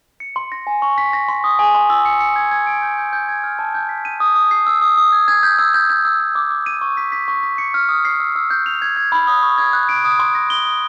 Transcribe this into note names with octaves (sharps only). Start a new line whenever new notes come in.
C#7
C6
A#6
G#5
C#6
B6
A#6
C6
D#6
G#5
C6
E6
C#7
C#7
G#6
G#6
D7
G6
G6
G6
G#6
F6
A5
G6
B6
D#7
D#6
D#6
C7
E6
D#6
D#6
G#6
G#6
G6
E6
G6
G6
E6
E6
D6
D6
D#7
C#6
B6
B6
C#6
B6
C#7
F6
D#6
C7
E6
E6
G6
F7
G#6
G#6
B5
D#6
C#6
G#6
F#6
D7
D#6
C6
A#6
G7
D#6